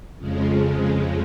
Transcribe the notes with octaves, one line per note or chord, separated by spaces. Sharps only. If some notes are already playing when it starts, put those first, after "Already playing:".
F2 C#3 F3 G#3